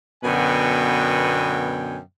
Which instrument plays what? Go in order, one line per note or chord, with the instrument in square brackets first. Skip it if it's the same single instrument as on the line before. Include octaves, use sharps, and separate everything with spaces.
[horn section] F#2 B2 D3 B3 G5 G#5